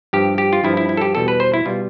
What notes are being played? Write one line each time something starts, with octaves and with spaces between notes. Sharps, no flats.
G2 F3 G4
G4
F4
G2 F3 E4
E4
E4
A4
G4
E2 B2 G3 A4
B4
C5
E4
B2 G3 F4